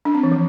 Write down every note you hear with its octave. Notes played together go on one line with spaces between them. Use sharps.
D4
C4
E3
F3